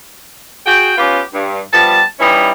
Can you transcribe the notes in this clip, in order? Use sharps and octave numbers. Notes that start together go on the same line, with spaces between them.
F#4 G#4 G5
B3 C#4 F4 G4
G2
F3 G3 B3 A5
E3 G3 C#4 D#4 E4